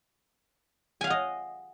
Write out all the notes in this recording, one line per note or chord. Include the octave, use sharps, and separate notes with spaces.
D#5 F5 F#5 G#5